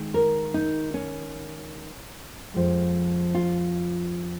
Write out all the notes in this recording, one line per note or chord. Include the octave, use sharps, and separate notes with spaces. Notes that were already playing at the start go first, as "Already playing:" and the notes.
Already playing: D#3 G#3
A#4
D#4
C#4
F2 F3 G#3
F4